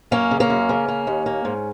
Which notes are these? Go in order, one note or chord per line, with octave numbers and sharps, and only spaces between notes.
F#2 A#3 C#4
C#3
A#3 C#4
F#2
C#3
A#3
D#2
A#3
G#2